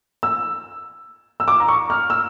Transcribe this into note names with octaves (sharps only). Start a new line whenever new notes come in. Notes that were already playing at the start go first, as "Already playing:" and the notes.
E6
E6
D6
A#5
C#6
F6
E6